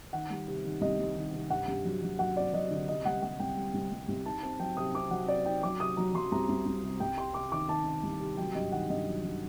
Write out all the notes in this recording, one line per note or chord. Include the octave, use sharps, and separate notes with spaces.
D#3 F#5
G3
C3
D#3
C2 D#5
G3
D#3
C3
G2 F#5
G2
F#3
F#3
F#3 F#5
C4 D5
F#3 D#5
D3
C3 D#5
G3 F#5
G3 F#5
C2 G5
G3
C2
G3
C2
D#4 A5
C4 A5
F#3 G5
C3 D#6
C4 D6
F#3 F#5
C4 D5
D#4 G5
F#3 D6
C3 D#6
F#3 A#5
F#3 C6
C2 A#5
C2
C2
C3
C2 G5
C3 C6
C3 D6
D#3 D6
D#3 A5
D#3
C2
C3
F#3 G5
G2 D#5
D#3 F#5
G2 D#5
F#3
G2